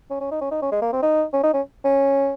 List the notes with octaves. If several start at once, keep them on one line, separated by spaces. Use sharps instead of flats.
C#4
C#4
D#4
C#4
D#4
C#4
G#3
A#3
C4
D#4
C#4
D#4
C#4
C#4